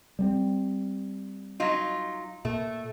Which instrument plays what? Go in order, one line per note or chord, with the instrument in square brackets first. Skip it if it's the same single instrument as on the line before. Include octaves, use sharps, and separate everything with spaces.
[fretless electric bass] G3 G#3 C4
[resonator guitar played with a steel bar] F#3 D#4 F4
[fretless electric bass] A#2 [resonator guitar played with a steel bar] A3